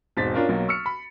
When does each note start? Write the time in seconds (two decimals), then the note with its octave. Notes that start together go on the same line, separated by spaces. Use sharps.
0.17 E1 G#2 C4 A6 B6
0.34 C#4 D4 F4 A#4
0.49 B1 F#3 A#3
0.68 C#6 E6 F6 C#7
0.86 B5